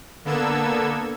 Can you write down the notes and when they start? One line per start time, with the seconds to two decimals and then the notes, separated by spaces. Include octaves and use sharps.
0.25 D3 A#3 B3 A4 E6 G#6